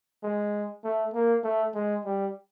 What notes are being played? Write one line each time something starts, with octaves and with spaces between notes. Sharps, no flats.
G#3
A3
A#3
A3
G#3
G3